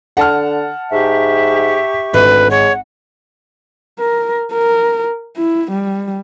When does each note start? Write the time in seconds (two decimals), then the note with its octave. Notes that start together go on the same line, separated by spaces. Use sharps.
0.17 D3 F#5 A5 F6
0.92 G#2 G4 E5 C#6
2.13 G#1 D2 B4
2.51 G#3 C#5 F#5
4.00 A#4
4.53 A#4
5.36 E4
5.72 G3